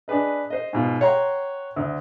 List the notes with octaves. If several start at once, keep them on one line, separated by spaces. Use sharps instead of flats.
D4 G#4 B4 D#5
C5 D#5
G#2 B2 F4
C#5 F#5 G5 A#5 C6
D2